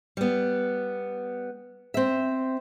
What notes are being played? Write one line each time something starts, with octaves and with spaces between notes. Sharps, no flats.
G3 B3
C4 E5